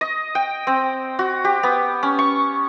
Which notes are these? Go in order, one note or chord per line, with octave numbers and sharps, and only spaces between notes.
D#5
G5
C4
F#4
G4
B3
C#4
C#6